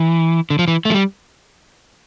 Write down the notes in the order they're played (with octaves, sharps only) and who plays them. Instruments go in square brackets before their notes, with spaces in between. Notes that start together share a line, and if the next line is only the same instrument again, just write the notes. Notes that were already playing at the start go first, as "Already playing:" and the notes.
Already playing: [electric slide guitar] E3
D3
F3
E3
A3
F3
G3